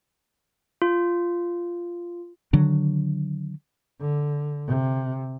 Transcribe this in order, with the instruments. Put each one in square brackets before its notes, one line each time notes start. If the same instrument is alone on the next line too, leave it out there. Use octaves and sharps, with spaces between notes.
[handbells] F4
[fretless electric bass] D3 D#3 F#3 D4
[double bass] D3
C3